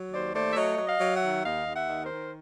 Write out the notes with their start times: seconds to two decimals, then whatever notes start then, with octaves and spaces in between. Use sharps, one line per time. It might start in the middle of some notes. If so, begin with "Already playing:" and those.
Already playing: F#3
0.12 D#2 C5 D5
0.34 A3 C5 D5
0.51 E5
0.56 F#3 C#5 D#5
0.78 F#3
0.86 D#5 F5
1.00 F#3
1.15 E5 F#5
1.23 D#3
1.44 D#2 D#5 F5
1.66 D#2
1.74 E5 F#5
1.89 D#3
2.03 A#4 C5
2.11 D#3